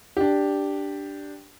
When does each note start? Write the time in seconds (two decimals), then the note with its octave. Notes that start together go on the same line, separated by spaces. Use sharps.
0.17 D4 G4